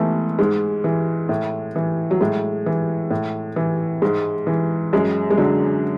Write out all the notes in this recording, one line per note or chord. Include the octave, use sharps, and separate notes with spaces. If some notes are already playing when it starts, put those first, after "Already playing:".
Already playing: G#2 E3 A3 B3
G#2 G#3
E3
A2
E3
F#3
A2 G#3
E3
A2
E3
G#2 G#3
E3
F#2 G#3
G#3
D3 F#3